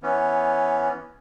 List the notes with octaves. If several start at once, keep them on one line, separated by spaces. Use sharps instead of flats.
E3 B3 C#4